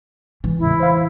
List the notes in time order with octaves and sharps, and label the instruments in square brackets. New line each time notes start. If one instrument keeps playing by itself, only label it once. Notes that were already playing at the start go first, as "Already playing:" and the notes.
[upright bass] E3 G#3
[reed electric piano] E2 A2 C#3 [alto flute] E4
[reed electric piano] C5 F5